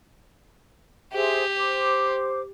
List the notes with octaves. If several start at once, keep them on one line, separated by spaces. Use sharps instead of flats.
G4 G#4 C5 E5
C5 D6